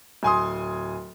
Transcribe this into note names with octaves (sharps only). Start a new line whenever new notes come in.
D1 G#5 C6 D#6